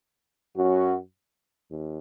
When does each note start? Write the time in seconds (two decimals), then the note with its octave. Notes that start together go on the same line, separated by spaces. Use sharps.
0.55 F#2 F#3 C#4 F#4
1.70 D#2